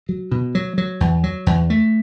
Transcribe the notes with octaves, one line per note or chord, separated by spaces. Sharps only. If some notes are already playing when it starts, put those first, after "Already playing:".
F#3
B2
F#3
F#3
E2
F#3
E2
A3